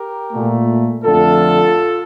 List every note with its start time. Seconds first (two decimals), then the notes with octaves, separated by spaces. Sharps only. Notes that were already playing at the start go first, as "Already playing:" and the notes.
Already playing: G4 A#4
0.32 A#2 A3
1.04 F2 D3 A3 F4 A4